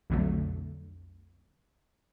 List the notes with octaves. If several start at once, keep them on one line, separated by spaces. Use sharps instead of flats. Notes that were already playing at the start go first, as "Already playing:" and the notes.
B1 F2 D3 F#3 A3